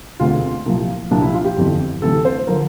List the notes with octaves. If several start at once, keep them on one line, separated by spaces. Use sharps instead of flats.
E1 D2 C3 F4
C2 A#2 F3
C2 A#2 F3 D4
E4
F4
G4
G1 F2 E3
D2 C3 E3 A4
C5
D3 F3 A#4